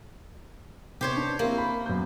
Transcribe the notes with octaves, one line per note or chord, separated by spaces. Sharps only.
C3 B3 G4 C5 C#5
D4
A#3 C4 E4 G4
B5
F#2 B3 G6